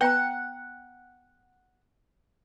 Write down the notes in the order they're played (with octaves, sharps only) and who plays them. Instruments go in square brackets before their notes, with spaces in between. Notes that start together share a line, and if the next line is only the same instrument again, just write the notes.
[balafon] B3 B4 [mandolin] F#5 [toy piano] G5 A#5